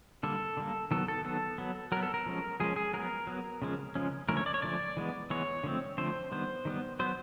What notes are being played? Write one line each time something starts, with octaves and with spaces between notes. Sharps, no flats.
D3 G3 A#3 A4
D3 G3 A#3
D#3 F#3 B3 A4
A4
D#3 F#3 B3 A4
F#3 B3
F#3 B3 A#4
A4
A#4
F3 G#3 C#4
F3 G#3 C#4 G#4
G#4
F#3 B3 A#4
F#3 B3
C#3 F3 G#3 C#4
C#3 F3 G#3 C#4
D3 F3 A3 C#4 A#4
C#5
D5
C#5
D3 F3 A3 C#4 D5
E3 G#3 B3
E3 G#3 B3 C#5
D3 F3 A3 C4
D3 F3 A3 C4 C5
D#3 G3 B3 C5
D#3 G3 B3
F#3 B3 C5